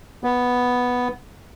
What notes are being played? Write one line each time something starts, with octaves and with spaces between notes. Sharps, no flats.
B3